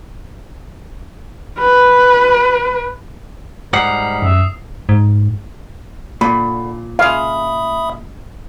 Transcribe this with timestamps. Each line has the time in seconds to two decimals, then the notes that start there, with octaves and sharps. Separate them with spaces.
1.58 B4
3.73 G#2 G3 A#4 F#5 D#6 C7
4.22 F#2 E5
4.89 G#2
6.21 A#2 D3 B5
6.99 C#3 G#3 E5 F5 B5 D#6